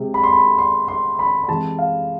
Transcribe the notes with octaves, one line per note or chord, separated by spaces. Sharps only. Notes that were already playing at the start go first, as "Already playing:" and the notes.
Already playing: C3 G#3
B5
C6
B5
C6
C6
B5
B5
C3 E3 G#3 A5
F5